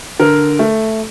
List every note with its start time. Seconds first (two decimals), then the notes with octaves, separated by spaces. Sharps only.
0.20 D3 A#4
0.59 A3